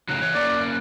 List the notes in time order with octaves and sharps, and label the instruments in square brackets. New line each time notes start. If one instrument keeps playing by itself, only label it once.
[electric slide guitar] A2 C#3 F#3 [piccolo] F#6
[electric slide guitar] E3 C#5
[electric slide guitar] A#3 C#4 [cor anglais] D5